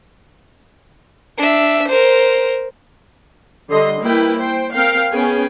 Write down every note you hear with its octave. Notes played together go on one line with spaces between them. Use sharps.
D4 E5
A#4 C5
D3 G3 D#5 C6
A#3 E4 B4 G5
C5 G5
C4 A#4 F5 G5
B3 C#4 G#4 G5 G#5